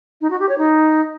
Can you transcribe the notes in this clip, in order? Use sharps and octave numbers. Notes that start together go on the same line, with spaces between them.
D#4
F#4
G4
C#5
D#4